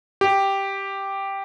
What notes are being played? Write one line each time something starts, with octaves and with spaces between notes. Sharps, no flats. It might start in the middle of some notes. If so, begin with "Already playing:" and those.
G4